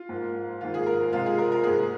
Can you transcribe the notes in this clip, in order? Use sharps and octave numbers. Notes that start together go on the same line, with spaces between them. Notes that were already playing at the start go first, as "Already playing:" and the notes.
Already playing: F4
G#2 F3 A#3
G#2 D#3 A#3 F4
G#4
A#4
C3 G#3 F4
G#4
A#4
A#4
G#2 G#3 G#4